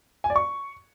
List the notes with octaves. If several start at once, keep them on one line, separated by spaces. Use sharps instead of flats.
G#5
D5
C#6